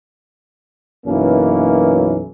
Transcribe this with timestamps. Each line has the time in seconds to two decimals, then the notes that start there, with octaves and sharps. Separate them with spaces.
1.06 B1 F#2 E3 A#3 C#4